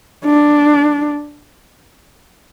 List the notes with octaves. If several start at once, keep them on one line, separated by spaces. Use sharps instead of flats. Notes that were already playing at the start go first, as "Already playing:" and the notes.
D4